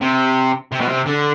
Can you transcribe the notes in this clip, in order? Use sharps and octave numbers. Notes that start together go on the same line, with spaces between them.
C3
C3
B2
C3
D3